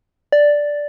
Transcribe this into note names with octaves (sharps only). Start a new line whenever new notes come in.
D5